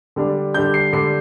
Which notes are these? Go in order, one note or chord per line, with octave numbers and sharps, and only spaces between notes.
D3 G3 D4
D3 G3 D4 G6
C7
D3 G3 D4 C7